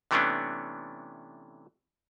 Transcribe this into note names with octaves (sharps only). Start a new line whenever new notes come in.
C3 E3 A3 B3 C#4 D4